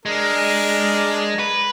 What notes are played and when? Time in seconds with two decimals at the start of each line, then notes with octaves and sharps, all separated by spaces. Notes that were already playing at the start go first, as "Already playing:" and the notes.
0.06 G#3 D4 A#4
1.39 B4